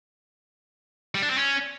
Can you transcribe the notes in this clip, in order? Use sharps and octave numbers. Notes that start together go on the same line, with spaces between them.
G3
D4
C4
C#4